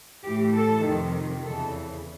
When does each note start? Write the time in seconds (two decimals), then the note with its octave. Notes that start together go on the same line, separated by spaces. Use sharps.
0.24 A2 E3 G4
0.54 A4
0.84 F2 C3 D#3
1.44 E2 C#3 E3 A4